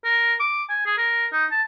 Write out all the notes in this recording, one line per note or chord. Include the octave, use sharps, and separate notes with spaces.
A#4
D6
G#5
G#4
A#4
D#4
A5